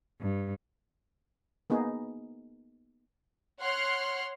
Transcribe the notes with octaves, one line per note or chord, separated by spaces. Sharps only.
G2
A#3 B3 D#4 G#4
C#5 F#5 C6 F6 F#6